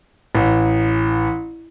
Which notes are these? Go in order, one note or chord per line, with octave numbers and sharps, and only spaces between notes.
A1